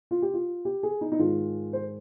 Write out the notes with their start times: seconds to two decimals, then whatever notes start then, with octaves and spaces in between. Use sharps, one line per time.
0.11 F4
0.22 G4
0.34 F4
0.65 G4
0.83 G#4
1.01 D#4
1.12 D#4
1.19 G#2 D#3 G#3 F4
1.73 C5